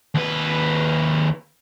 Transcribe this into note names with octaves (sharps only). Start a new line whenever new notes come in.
D#2 B4